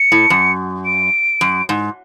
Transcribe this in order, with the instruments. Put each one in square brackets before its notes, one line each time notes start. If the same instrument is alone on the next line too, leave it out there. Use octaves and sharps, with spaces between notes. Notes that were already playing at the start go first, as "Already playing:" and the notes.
Already playing: [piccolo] C#7
[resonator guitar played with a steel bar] A2
F#2
[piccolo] D7
[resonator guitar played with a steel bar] F#2
G#2